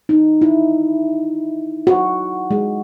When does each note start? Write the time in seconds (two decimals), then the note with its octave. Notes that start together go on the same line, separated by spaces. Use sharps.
0.09 D#4
0.41 E4
1.87 F#4
2.51 G#3